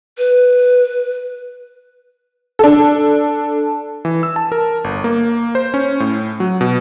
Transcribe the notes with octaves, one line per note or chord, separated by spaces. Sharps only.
B4
D4 A4
E3
E6
A5
A#4
G1
A#3
C5
C#4
A2
F#3
B2